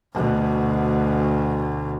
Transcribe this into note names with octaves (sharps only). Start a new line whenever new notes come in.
D2 B2